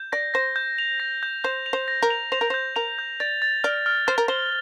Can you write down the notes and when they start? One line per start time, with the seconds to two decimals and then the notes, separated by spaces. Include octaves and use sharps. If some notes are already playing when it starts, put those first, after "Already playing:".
Already playing: G6
0.12 D5 A#6
0.34 C5 A#6
0.56 G6
0.78 F7
1.00 A#6
1.23 G6
1.44 C5 G6
1.66 F7
1.73 C5
1.88 A#6
2.03 A#4
2.10 F7
2.32 C5 F7
2.41 A#4
2.50 C5 G6
2.76 A#4 F7
2.99 G6
3.20 D5 A6
3.42 A6
3.64 D5 F6
3.86 F6
4.07 C5 F6
4.18 A#4
4.28 C5 G7